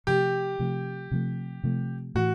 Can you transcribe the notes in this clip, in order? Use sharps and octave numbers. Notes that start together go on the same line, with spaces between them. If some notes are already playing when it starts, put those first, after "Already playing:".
C3 F3 A3 G4
C3 F3 A3
C3 F3 A3
C3 F3 A3
A2 E3 F#4